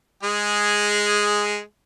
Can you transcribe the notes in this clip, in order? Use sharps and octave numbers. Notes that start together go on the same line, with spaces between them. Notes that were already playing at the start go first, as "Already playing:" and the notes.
G#3 G#4